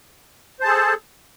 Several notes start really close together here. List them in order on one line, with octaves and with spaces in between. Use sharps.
C5 A5 G#4 A4